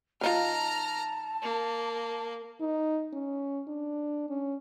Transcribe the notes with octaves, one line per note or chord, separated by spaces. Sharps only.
D#3 D#4 F4 A5 A#5 F6
A#3
D#4
C#4
D4
C#4